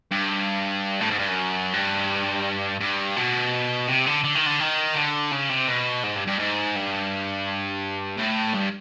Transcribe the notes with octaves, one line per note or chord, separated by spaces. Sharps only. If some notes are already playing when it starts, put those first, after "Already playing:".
G2
A2
G#2
G2
F#2
G2
G2
B2
C3
D3
D3
D#3
D3
D#3
D3
C#3
C3
B2
G#2
G2
G2
G#2
G2
A2
G2